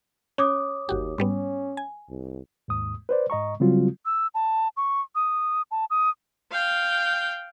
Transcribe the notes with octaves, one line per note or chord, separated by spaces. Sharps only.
C#4 C#5 D6 D#6
G1 D#2 F#4 G4
G#2 G3 B3 C#4
G#5
C2
D#2 G#2 D#6
B4 C5 D5
G#2 D#5 A#5 C#6
C#3 F#3 G3 C4 F4 F#4
E6
A5
C#6
D#6
A5
D#6
F5 G5